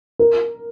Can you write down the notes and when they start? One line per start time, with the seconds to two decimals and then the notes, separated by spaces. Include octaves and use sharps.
0.19 A#4